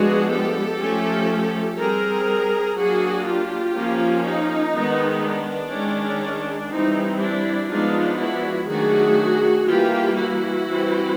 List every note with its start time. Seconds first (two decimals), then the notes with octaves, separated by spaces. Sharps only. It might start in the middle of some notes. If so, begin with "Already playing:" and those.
Already playing: F3 G#3 B3 D4 F#4 G#4
0.30 G4 A4
0.79 F3 A3 C#4
1.78 G3 C4 G#4 A#4
2.77 F#3 A#3 D4 F#4 G#4
3.26 F4 G4
3.75 F3 A#3 C#4
4.24 D#4
4.74 D#3 G#3 B3
5.23 D4
5.72 D#3 G#3 C#4
6.71 E3 G3 C4 D#4
7.20 D4 E4
7.70 F3 G#3 B3 D4 D#4 F4
8.19 E4 F#4
8.68 D#3 F#3 A3 D4 F#4 G#4
9.67 E3 G3 A#3 F4 G4
10.16 E4 F#4
10.66 E3 G3 C4